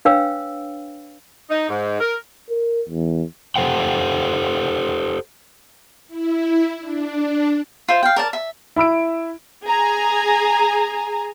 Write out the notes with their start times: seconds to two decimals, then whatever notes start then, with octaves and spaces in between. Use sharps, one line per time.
0.05 D4 B4 C#5 F5 G5 E6
1.50 D#4
1.69 G#2
2.00 A#4
2.50 A#4
2.88 E2
3.56 G4 A4 C5 F#5 G5
6.08 E4
6.80 D4
7.88 F4 C5 E5
8.03 F5 G5
8.16 A#4 D5 A5
8.33 E5
8.76 E4 B5 E6 D7
9.65 G#4 G#5 A#5